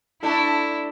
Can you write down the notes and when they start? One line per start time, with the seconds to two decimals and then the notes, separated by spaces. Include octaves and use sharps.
0.23 A3 D4 E4 A4